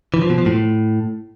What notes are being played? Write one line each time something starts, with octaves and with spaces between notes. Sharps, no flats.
E3
F3
B2
F3
A2